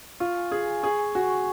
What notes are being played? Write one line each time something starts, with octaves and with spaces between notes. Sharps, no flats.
F4 C#6
G#5
G#4 G#5
G#5
G#4 C#6
G#5
F#4 G#5
C#6